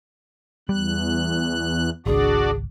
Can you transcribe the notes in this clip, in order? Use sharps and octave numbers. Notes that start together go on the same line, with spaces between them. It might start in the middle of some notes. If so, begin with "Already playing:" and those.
E2 G3 F#6
G#1 C#2 D4 F#4 G#4 D5